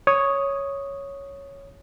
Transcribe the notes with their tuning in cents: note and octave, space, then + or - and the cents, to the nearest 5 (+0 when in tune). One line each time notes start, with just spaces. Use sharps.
C#5 +0 D#6 +0